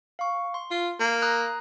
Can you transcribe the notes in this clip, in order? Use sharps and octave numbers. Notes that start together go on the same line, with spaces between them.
F5 C#6
C6
F4
A#3
A#5 D#6 F#6